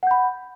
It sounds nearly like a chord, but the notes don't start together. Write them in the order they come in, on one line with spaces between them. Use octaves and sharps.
F#5 G6 B5